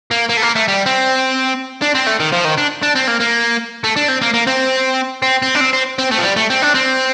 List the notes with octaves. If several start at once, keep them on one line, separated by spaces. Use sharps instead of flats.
A#3
A#3
A3
A#3
A3
G3
C4
D4
C4
A3
D#3
F3
D#3
D4
D4
C4
A#3
A#3
A3
D4
C4
A#3
A#3
C4
C4
C4
D4
C4
C4
C4
A3
F3
G3
A3
C4
D4
C4